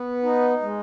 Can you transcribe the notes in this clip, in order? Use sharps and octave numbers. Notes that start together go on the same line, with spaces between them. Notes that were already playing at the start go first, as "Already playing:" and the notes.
Already playing: B3
D#4
G#3